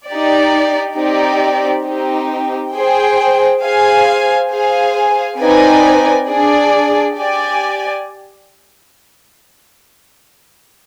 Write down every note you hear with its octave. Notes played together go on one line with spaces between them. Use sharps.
D#4 G4 D5
C4 D#4 G4 D5
C4 D#4 G4
G#4 C5 G5
G#4 C5 F5 G#5
G#4 C5 F5 G#5
C4 D#4 B4 D5 G#5
D4 G#4 D5
G4 D5 G#5